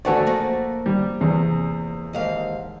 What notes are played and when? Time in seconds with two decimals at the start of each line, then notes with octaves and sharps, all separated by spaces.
0.05 F3 A3 F#4 C#5 D5 G#5
0.27 F3 A#3
0.86 G3
1.21 E2 C3
2.13 D#2 G#2 F5